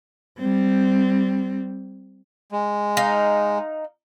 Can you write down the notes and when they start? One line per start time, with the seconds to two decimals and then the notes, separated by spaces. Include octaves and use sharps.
0.38 G3 C4
2.52 G#3
2.97 D#4 F5